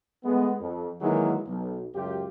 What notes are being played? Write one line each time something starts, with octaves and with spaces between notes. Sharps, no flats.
G#3 A3 B3
F2
D#3 E3 F#3 G#3 A#3
B1
C#2 F#2 F4 G4